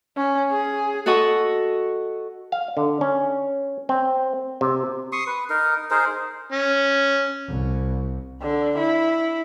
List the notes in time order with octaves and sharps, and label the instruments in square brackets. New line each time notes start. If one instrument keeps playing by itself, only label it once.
[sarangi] C#4
G#4
[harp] F#4 A4 D#5 F#5 C#6
[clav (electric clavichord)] F5
D3
C#4
C4
C3
[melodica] C6 C#6 D#6
B4
D#4 A#4
D#4 G#4 A#4 C5
[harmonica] C#4
[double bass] C2
[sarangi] D3
E4